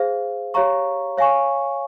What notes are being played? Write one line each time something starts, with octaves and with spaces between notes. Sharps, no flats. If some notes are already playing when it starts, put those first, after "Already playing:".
Already playing: G#4 C5 F5
G4 C#5 F5 A#5 C#6
C#5 F5 G#5 C#6